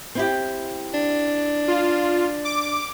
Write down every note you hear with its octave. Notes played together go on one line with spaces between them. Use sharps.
C4 E4 G4
D4
F4
D6